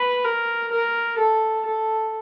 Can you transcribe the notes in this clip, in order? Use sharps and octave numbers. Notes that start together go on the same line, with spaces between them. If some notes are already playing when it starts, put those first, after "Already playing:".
Already playing: B4
A#4
A#4
A4
A4